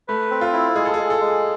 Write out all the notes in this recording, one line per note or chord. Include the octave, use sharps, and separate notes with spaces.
A3 B4
C4
F4
E4
G#3 G#4
A4
G#3 G#4
A4
G#3